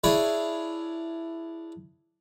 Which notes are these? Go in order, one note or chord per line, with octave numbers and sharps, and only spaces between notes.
D4 E4 G#4 C#5 E5 F5